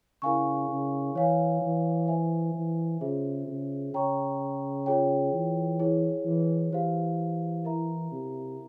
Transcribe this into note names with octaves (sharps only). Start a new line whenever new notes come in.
C#3 E4 A#4 F5 G#5 C#6
C#3
E3 C#5 F5 G#5
E3
C5 E5 G#5
E3
C#3 F4 G#4 C5 E5
C#3
C#3 C#5 G5 A#5 C#6
F4 G#4 C#5 G5
E3
E4 G#4 C#5
E3
E3 G4 C5 F5
E4 A#4 E5 A#5
C3